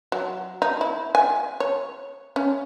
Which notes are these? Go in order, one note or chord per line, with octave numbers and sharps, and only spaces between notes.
F#3
D#4
E4
G#5
C#5
C#4